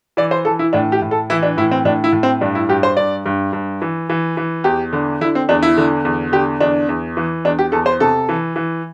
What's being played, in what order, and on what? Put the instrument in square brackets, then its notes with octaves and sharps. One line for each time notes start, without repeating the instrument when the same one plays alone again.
[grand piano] E3 D5
C5
E3 A4
E4
A2 D4
G4
A2
A4
E3 E4
D4
A2 E4
C4
A2 D4
E4
A2
C4
G2 D4
E4
G2 G4
C5
G2 D5
G2
G2
E3
E3
E3
E2 G4
D3
D3 E4
C4
E2 D4
E4
D3
E2
D3 G4
E2 D4
E2
E3
E2 D4
G4
E2 A4
C5
C3 A4
E3
E3